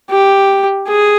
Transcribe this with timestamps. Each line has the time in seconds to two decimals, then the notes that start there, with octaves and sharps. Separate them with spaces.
0.11 G4
0.89 G#4